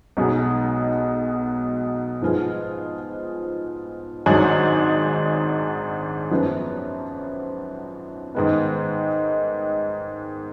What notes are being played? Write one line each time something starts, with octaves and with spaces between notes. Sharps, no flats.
B1 B2 G#3 D#4 G#4
G#2 F3 B3 F4 G#4
G#1 G#2 F#3 D4 G#4
F#2 F3 B3
G#2 D#3 G#3 B3